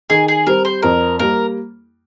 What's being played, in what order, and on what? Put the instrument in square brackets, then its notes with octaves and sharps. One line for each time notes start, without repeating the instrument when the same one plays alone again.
[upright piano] D#3 [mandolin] G#4
[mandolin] G#4
[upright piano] G3 C4 [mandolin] A#4
[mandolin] C5
[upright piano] F2 [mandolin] A#4
[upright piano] G3 A#3 [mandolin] A#4